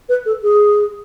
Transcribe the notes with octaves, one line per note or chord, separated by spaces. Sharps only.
B4
A4
G#4